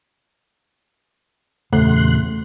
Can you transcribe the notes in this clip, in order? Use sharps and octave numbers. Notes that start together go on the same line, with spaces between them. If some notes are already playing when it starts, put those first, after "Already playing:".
E2 A#2 C#3 A3 C6 F#6